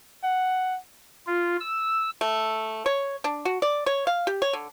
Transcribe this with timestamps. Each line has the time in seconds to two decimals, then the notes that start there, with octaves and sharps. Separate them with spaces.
0.23 F#5
1.27 F4
1.60 E6
2.21 A3
2.86 C#5
3.24 D4
3.45 F#4
3.62 D5
3.86 C#5
4.07 F5
4.27 G4
4.42 C#5
4.53 D3